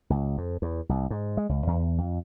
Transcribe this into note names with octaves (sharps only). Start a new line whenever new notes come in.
C#2
F2
E2
C2
G#2
G#3
C#2
E2
F2